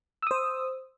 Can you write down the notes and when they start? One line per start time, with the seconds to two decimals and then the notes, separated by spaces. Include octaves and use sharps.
0.23 E6
0.27 D#6
0.31 C5